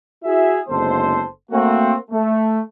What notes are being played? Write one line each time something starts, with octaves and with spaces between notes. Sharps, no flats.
E4 F#4 G#4 E5
F#1 D3 G#3 B3 A4 C5
A3 A#3 C4 F#4
A3